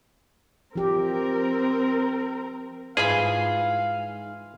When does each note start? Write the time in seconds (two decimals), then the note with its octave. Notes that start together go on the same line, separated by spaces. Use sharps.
0.76 F3 C4 G4 A#4
2.97 G#2 E3 F4 G#4 F5 B5